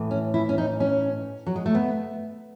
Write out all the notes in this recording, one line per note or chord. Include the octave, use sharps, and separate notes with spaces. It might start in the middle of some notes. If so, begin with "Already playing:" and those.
Already playing: A2 E3
C#4
E4
C#4
D#4
C#4
F#3
G#3
A3
B3